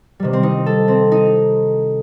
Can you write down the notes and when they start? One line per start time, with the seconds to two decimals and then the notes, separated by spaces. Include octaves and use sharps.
0.20 C3 D#3 G3
0.33 C4
0.43 D#4
0.66 A4
0.88 C4
1.12 D#4